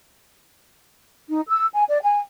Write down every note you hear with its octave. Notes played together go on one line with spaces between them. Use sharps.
D#4
E6
G#5
D5
G#5